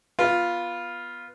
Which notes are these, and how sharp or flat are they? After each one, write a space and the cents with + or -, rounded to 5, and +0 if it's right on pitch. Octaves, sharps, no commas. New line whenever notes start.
B3 -10 F4 +0